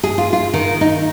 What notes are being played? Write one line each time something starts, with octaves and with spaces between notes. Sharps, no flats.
G#4
F4
F4
D#3
D#4